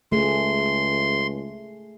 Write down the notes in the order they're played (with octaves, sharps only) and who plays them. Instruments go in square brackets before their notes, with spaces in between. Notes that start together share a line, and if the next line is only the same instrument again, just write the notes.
[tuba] C#2 [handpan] A3 G#4 [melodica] C6